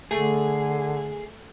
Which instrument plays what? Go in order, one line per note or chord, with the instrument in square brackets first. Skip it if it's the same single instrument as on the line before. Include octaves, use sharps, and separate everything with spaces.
[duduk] D3 [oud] A3 [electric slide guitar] G#4